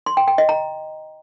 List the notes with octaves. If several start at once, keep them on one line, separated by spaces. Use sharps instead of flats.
C6
G5
G5
D#5
A#5